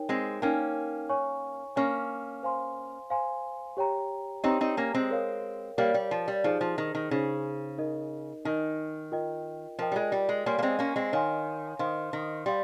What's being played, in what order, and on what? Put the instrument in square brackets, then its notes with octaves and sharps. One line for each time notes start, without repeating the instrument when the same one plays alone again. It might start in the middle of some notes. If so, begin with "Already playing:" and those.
Already playing: [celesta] D#4 A#4 C#5 G5
[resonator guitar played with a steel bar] G#3 C4
[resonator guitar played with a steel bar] A#3 C#4 [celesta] D#4 A#4 C#5 G5
[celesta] C#5 G#5 C#6
[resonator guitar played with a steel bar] A#3 C#4 [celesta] C#5 G#5 C#6
[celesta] C5 F5 G#5 C6
C5 F5 G#5 C6
G4 C#5 G5 A#5
[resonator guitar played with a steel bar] C4 D#4 [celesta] G4 C#5 G5 A#5
[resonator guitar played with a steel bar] C4 D#4
A#3 C#4
G#3 C4
[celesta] A#4 C#5 F5
[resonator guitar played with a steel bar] G3 A#3 [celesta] A#4 C#5 F5
[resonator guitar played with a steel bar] G3
F3
G3
[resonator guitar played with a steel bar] F3 [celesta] D#4 G#4 C5
[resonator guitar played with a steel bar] F3
D#3
D#3
[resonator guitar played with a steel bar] C#3 [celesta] D#4 G#4 C5
[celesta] D#4 A#4 D#5
[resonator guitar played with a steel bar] D#3 [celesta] D#4 A#4 D#5
[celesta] F4 A#4 D#5 G5
[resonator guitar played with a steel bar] F3 [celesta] F4 A#4 D#5 G5
[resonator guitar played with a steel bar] G3
G#3
G3
G#3
[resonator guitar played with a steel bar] G3 A#3 [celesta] C#5 F5 G#5 C6
[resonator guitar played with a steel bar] A#3
G#3 C4
A#3 C#4
G#3 C4
[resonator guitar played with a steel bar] D#3 [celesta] C#5 F5 G#5 C6
[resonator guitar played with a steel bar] D#3 [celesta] C5 F5 C6
[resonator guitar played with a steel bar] D#3
[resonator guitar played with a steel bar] G3 [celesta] F5 C6